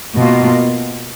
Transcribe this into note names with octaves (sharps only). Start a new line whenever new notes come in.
B2 A#3 F4